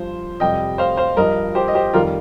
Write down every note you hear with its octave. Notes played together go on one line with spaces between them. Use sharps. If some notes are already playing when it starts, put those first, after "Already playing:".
Already playing: G2 F3 C5
F2 C3 G3 D#5 G5
C5 F5
C5 F5
G2 F3 A#4 D#5
G4 C5
D#5
G4 C5
F2 D#3 G3 F4 A#4